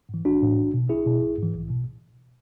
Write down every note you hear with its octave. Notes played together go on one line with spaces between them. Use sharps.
G#2 E3
B1 D4 F#4
A2 E3
B1
B2
B1 E4 G#4
B2
A1
G#2 E3
B1
B2